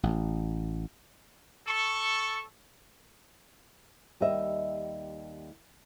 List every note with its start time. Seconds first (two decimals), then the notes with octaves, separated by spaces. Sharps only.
0.03 A1
1.68 A4 C#6
4.20 D#2 G3 D#5 E5